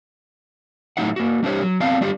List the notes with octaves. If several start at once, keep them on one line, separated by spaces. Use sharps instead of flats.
A2 F#3 D4 D#4 E5 F#5
A#3 F#4
G3 D4 G4 C5 C#5
F#3
B3 C4 D5 F5 A5
G3 D4 F4 G4